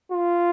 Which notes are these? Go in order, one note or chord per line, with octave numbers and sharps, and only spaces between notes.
F4